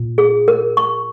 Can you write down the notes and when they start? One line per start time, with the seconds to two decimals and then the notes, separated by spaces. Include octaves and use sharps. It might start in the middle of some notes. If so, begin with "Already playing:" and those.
Already playing: A#2
0.18 G#4
0.48 A#4
0.77 C#6